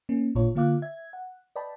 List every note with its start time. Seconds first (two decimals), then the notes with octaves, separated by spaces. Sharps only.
0.09 A#3 C#4
0.35 A1 A#2 D4 F4 C#5
0.55 D3 A#3 F4 F5 D6 F#6
0.82 E5 G#6
1.13 F#5
1.56 B4 D5 D#5 G5 A5 B5